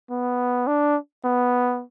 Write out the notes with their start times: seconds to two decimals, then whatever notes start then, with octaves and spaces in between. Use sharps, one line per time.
0.10 B3
0.67 D4
1.25 B3